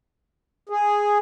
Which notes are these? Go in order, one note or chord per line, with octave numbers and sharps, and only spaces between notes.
G#4